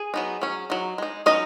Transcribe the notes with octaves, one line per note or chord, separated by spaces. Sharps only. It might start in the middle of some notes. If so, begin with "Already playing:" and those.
Already playing: G#4 G#5
F#3 B3 D#4
F#3 C#4
F#3 D#4
G#3 D#4
F#3 C#4 D#4 D#5